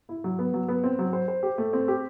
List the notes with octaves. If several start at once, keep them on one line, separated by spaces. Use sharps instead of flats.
E4
F#3
B3
F#3
B3
C4
F#3
C5
C5
G4
A3
C4
G4